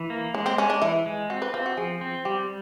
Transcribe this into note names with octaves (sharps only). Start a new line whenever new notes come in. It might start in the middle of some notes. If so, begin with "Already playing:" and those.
Already playing: E3
A#3
G#3 C#4
C4
G#3 C#4
D4
E3 E4
G#3
C4 F#4
B4
C4 F4
F#4
F3 G#4
C4
G3 G4